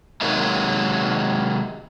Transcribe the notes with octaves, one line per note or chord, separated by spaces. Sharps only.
C3 D#3 F#3 G#3 A#3